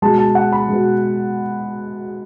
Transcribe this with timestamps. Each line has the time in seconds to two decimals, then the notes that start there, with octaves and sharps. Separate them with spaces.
0.02 B2 G#3 A5
0.18 A5
0.35 F#5
0.52 B5
0.69 B2 G#3